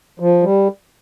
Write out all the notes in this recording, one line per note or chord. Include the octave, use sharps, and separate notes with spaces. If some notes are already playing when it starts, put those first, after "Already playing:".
F3
G3